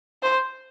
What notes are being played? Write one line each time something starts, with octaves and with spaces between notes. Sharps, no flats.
C5